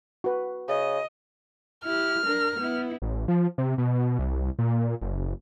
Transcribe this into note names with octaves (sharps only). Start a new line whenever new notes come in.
F#4 B4
C#3 D#5
E4 G4 F6
D4 A#4
B3 E4
A1
F3
C3
B2
C2
A#2
F#1